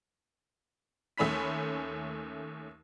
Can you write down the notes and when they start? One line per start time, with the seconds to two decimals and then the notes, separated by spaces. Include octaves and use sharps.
1.18 D#2 A3 C#4 B5 B6